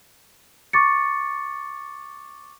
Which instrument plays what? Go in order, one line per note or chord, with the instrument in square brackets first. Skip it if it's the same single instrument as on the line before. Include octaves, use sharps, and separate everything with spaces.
[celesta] C#6 D6 A6 C#7